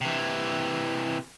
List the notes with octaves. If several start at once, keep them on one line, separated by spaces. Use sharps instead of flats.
C3 E3